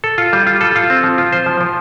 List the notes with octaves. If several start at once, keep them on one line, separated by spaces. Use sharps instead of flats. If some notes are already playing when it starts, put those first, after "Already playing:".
A4
F4
G3
F4
A4
F4
C4
F3
F4
C5
F3
F3